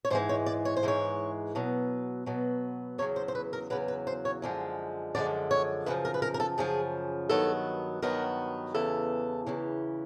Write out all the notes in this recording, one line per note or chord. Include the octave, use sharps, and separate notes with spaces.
C#5
G#2 E3 G#3 C5
C#5
D5
C#5
C5
G#2 E3 G#3 C#5
B2 F#3 B3
B2 F#3 B3
E2 C#3 F#3 C#5
C5
C5
B4
A#4
E2 C#3 F#3 B4
B4
C5
C#5
F#2 D3 F3 G#3
F#2 D3 F3 G#3 D5
C#5
F#2 C#3 F3 B4
A#4
B4
A#4
A#4
A4
F#2 C#3 F3 G#4
G2 D#3 F#3 B3 A4
G2 D#3 F#3 B3 A#4
E2 C#3 E3 A4
E2 C#3 E3